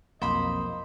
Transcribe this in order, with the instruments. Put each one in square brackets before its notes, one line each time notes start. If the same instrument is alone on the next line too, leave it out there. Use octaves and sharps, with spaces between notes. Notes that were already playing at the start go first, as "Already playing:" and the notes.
[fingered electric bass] B1 F2 B2 [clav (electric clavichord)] A#3 [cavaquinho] C5 B5 [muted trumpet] D#5